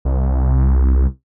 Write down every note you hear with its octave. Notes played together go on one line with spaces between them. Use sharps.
C2